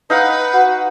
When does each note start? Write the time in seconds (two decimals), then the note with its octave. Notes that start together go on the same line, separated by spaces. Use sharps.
0.10 D#4 B4 F5 F#5
0.54 F#4